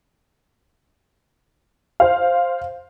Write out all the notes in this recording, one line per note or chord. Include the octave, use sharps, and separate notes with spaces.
C5 F5